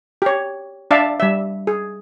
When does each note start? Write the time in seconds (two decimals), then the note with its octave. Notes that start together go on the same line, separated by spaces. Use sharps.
0.22 G4 C#5
0.91 D4 D5 E5 F5 A5
1.20 G3 E5
1.67 G#4